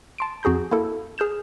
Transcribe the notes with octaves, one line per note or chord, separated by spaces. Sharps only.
A5 C6 D7
F2 F#4 G#4 A#5 G6
A#3 E4 A4
G#4 F6 G6 E7